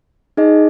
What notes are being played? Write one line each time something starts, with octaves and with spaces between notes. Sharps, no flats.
D#4 G#4 D#5